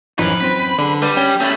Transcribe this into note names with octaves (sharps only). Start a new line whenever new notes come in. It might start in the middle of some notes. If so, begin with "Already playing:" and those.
A1 F#2 E3 F3 D#4 B4
F#2 C4 C5 B6
D3 G#4 D5
G3 B4 D5
C#4 G5
G3 A3 C#4 B5